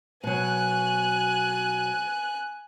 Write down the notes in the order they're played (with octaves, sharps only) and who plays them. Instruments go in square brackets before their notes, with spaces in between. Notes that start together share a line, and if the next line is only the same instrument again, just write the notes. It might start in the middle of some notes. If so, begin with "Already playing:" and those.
[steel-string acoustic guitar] B2 F#3 [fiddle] G#5 F#6